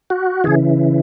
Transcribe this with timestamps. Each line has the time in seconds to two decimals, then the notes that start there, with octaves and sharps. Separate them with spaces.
0.10 F#4
0.44 C#3 E3 G#4